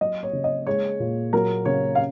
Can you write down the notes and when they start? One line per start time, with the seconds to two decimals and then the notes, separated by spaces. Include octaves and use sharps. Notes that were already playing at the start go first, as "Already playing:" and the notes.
0.01 F#3 D#5
0.23 C#5
0.33 C#3
0.44 D#5
0.67 G#3 C#5
1.00 A#2
1.33 F#3 A#4
1.65 C#3 C#5
1.95 F5